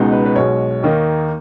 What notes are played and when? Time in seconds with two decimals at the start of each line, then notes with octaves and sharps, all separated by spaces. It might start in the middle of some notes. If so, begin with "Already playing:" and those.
Already playing: C#2 B2 G#3 B3 D#4
0.12 B4
0.25 B4
0.35 B1 B2 G#3 C#5
0.83 D#2 D#3 A#3 D#4